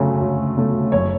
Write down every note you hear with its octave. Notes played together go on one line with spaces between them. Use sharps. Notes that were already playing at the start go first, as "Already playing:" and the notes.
Already playing: D2 C#3 F#3 A3
D2
C#3 F#3 A3
F#1 C#5